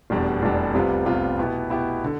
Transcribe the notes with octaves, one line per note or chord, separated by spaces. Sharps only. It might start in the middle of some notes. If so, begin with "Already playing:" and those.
F1 E2 B2 G3 D4
F1 E2 B2 G3 D4
C2 C3 G3 B3 F4
C2 C3 G3 B3 F4
B2 B3 E4 G4
B2 B3 E4 G4
D3